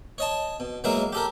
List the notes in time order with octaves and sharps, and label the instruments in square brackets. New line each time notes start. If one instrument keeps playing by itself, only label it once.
[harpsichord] C#5 D#5 A5
B2
B2 F#3 G#3 A#3 E4 A#4
G4 A4 A#4